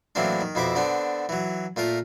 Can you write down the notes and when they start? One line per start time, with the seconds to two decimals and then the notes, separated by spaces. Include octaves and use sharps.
0.15 A2 E3 F#3 A#3 C4 D4
0.41 D#3
0.55 F2 B2 C4 E4 E5 D6
0.75 D3 B3 C4 D4
1.29 E3 F#3
1.76 A#2 A3 F4 A#4